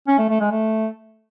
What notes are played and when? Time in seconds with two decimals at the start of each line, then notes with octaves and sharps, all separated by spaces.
0.08 C#4
0.19 A3
0.29 A3
0.40 G#3
0.51 A3